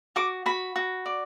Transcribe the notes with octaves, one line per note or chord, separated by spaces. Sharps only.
F#4 D6
F#4 B5
F#4
D5